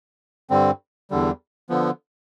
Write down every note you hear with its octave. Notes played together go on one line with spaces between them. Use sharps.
G2 D3 G3 C4
E2 D3 G3
D3 F3 B3